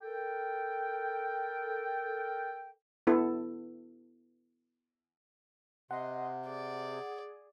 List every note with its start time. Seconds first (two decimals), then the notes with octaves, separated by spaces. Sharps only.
0.03 A4 A#4 G5
3.07 B3 E4 A4
5.91 C3 D#5 F#5 C6
6.47 G#4 D5